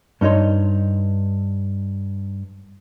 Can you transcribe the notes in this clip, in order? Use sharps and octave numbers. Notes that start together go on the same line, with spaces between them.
G2 C#4 D#4 C#5 C6